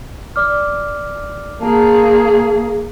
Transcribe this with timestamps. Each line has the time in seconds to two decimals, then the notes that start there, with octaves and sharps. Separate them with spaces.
0.36 D5 D6 F6
1.61 A#3 G#4 A5